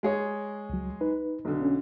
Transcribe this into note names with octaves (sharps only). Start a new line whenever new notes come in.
G#3 G#4 C#5
C#2 F#3
D#4 B4
B1 D3
C#4